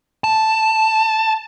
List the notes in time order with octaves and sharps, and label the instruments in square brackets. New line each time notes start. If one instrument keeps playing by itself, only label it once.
[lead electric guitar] A5